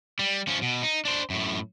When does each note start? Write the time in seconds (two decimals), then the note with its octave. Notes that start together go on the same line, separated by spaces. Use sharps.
0.19 G3
0.48 F3 C#4
0.62 B2
0.83 D#4
1.05 D4 C5
1.30 F#2 A2